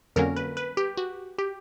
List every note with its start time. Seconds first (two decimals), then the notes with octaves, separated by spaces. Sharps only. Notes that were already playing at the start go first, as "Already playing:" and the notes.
0.16 F2 D3 F#3 A#3 C#4 A#4
0.36 B4
0.57 B4
0.77 G4
0.97 F#4
1.38 G4